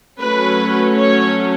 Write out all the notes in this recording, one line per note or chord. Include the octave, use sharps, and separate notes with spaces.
F#3 A3 C#4 B4
C#5